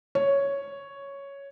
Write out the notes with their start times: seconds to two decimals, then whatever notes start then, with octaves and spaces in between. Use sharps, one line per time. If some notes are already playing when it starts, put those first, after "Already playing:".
0.15 C#5